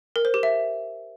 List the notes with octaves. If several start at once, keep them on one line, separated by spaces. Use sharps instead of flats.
A#4
C5
G4
E5